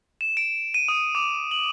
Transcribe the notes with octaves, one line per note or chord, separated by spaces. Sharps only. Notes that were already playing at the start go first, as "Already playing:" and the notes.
E7
D7
D#7
D#6
D6
F#7